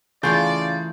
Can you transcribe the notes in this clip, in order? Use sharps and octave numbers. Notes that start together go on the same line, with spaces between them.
C#3 E3 A3 F4 G#4 B4 D5 G6